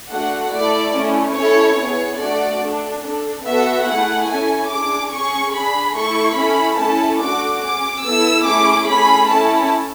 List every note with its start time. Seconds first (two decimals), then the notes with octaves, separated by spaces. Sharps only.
0.11 A3 D4 F#4 A4 F#5
0.52 A3 E4 A4 D5
0.95 A3 C#4 E4
1.36 C#4 E4 A4 C#5
1.78 B3 E4 G#4 C#5
2.19 A3 D4 F#4 A4 D5
2.62 D4 A4
3.03 D4 A4
3.45 B3 F#4 A4 E5
3.87 A3 E4 G#4 F#5
4.28 C#4 E4 A4 G#5
4.71 D4 G#4 D6
5.12 C#4 G#4 C#6
5.53 D4 G#4 B5
5.96 A3 E4 A4 C#6
6.37 C#4 E4 A4 B5
6.79 A3 C#4 E4 A4 A5
7.21 D4 F#4 A4 D6
7.62 C#4 G#4 D6
8.04 B3 E4 A4 E6
8.46 A3 C#4 E4 G#4 D6
8.88 A3 C#4 G#4 B5
9.30 C#4 E4 A4 A5